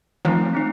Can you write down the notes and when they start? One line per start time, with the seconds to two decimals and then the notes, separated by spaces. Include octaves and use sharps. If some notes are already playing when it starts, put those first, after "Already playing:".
0.25 D#3 F3 A3 C4 D#4
0.54 A3 C4 D#4